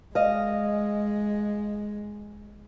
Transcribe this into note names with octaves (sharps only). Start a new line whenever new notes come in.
G#3 D#5 F5